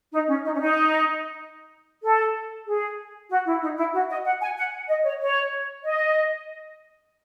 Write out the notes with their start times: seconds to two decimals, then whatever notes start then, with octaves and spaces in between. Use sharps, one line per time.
0.12 D#4
0.28 C#4
0.44 D#4
0.56 C#4
0.60 D#4
2.03 A4
2.66 G#4
3.30 F#4
3.46 E4
3.62 D#4
3.77 E4
3.93 F#4
4.09 D#5
4.25 F#5
4.40 G#5
4.57 F#5
4.88 D#5
5.04 C#5
5.20 C#5
5.84 D#5